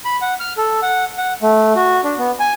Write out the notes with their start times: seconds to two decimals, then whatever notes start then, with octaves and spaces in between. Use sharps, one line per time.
0.05 B5
0.22 F#5
0.40 F6
0.57 A4
0.82 F#5
1.18 F#5
1.42 A3
1.75 F#4
2.04 D4
2.18 B3
2.40 G#5